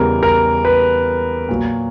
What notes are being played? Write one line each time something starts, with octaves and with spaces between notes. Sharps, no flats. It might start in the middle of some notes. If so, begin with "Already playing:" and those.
Already playing: E2 C#3 E3 G3 A#4
A#4
B4
A#2 F#3